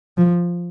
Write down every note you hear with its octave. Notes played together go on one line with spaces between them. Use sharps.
F3